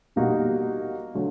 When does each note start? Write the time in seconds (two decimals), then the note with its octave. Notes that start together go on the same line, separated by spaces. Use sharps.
0.16 B2 G3 A#3 D#4 F#4
1.15 D3 F#3 A3